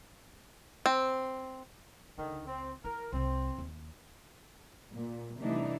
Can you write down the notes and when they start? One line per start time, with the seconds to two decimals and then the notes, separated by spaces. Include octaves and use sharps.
0.86 C4
2.17 C#2 D3 D#3
2.47 C4
2.84 E4 A#4
3.13 C2 C3 C4
3.58 D#2
4.94 A#2
5.40 C3 E3 G3 A3 D4 D#4